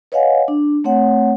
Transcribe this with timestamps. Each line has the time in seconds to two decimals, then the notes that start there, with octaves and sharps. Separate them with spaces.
0.12 B4 C#5 D#5 F5 F#5 G#5
0.48 D4
0.84 A3 C4 C#5 F#5